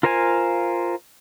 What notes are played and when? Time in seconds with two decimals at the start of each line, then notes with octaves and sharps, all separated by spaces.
0.03 F4 A#4 C5 F5 G#5